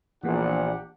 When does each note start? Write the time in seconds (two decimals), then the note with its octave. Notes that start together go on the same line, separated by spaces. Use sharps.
0.23 A#1 E3 A#3 B3 D4 G4 F#5